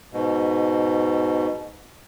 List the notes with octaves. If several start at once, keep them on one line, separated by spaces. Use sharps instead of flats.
G#2 B2